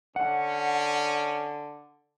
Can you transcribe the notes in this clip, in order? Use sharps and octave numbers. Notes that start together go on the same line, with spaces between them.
D3 C#4 F#5